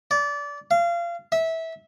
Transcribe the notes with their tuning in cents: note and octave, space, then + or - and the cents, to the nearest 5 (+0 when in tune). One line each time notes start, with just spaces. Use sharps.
D5 -25
F5 -25
E5 -20